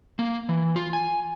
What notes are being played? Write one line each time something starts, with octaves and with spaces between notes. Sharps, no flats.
A#3
E3
F4
G#5